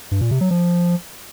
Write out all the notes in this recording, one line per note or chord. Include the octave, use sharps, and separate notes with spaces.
G2
A#2
C3
F#3
F3